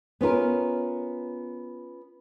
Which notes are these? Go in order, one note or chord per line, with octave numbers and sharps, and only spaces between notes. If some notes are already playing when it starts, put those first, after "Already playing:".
B3 C#4 F4 A#4